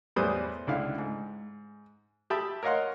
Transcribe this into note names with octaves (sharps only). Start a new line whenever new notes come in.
E2 A2 G3 B4 C5 D#6
C#2 D3 E4 F5
G#2
G4 E5 A5 B5 D#6
A#4 C#5 D#5 F5 F#5 C6